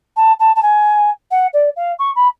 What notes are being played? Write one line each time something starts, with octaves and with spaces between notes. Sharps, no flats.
A5
A5
A5
G#5
F#5
D5
F5
C#6
B5